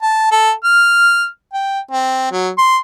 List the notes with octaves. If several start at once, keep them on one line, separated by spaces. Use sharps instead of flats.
A5
A4
F6
G5
C4
F#3
C6